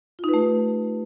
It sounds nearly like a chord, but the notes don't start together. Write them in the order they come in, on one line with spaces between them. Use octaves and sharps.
F4 D#4 B4 A3 G4